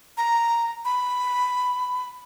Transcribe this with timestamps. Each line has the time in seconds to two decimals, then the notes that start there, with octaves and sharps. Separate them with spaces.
0.17 A#5
0.85 B5